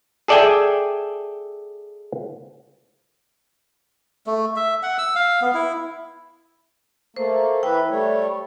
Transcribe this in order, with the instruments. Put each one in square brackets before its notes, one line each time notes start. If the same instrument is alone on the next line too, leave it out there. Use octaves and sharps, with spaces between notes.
[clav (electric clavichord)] G#4 A4 D5 E5 G5 G#5
[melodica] A3
E5
F#5
E6
F5
B3
E4
[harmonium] A3 A#3 [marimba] C5
[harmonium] E3 B4 E5 [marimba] G5
[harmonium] G3 A3 C#5